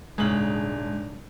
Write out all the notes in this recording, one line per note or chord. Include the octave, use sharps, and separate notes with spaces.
D#1 G#2 C#3 G#3 D4 G#4 F#7